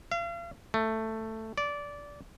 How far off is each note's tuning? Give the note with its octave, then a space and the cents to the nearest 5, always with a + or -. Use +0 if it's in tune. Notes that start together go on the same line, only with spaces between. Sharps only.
F5 -40
A3 +10
D5 -15